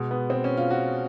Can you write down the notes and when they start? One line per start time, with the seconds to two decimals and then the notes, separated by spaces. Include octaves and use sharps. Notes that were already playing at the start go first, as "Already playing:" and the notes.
Already playing: B2 G#3
0.11 B3
0.30 C4
0.44 C#4
0.57 F4
0.70 F#4